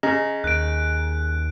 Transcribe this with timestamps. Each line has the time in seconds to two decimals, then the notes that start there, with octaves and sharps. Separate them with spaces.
0.03 C#3 D#5 A#5 A#6
0.44 D#2 F#6 D7